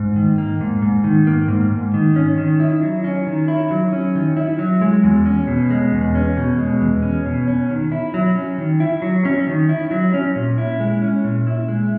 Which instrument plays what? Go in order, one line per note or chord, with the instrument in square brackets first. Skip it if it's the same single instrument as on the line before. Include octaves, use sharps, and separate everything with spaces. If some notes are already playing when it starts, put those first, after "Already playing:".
Already playing: [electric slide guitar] G#2
D#3
A#3
G#2
G#2
D#3
A#3
G#2
G#2
D#3
C#4
D#3
E4
F#3
C#4
D#3
E4
F#3
C#4
D#3
E4
F#3
G#3
E2
C#4
B2
G#3
E2
C#4
B2
G#3
E2
C#4
B2
C#4
D#3
E4
F#3
C#4
D#3
E4
F#3
C#4
D#3
E4
F#3
C#4
A#2
E4
G#3
C#4
A#2
E4
G#3